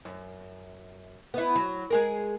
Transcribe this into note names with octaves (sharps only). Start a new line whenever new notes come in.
F#2
B3 E4
F#3
G#3 G#4 A#4